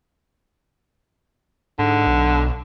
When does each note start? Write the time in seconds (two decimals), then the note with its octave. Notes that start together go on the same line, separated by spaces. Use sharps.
1.79 G#2 D3
2.07 B1